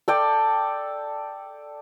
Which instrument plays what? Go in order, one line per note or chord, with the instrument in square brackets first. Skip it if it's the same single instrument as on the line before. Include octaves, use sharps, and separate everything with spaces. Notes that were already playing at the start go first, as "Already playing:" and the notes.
[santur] A4 D5 G5